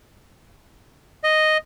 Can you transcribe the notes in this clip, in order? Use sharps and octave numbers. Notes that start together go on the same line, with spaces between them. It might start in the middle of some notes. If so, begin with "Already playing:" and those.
D#5